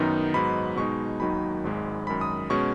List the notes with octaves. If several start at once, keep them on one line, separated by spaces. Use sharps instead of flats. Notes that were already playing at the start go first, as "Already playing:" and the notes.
Already playing: F#2 D#3 B3 D#4
G#2 F#3 B3 D#4 B5
B2 G#3 D#4 C#6
D#2 D#3 F#3 D#4 B5
G#1 G#2 G#3
F#2 D#3 G#3 B5
D#6
B2 G#3 C#4 C#6